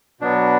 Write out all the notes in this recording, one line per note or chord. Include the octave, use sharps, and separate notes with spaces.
B2 F#3 B3 D4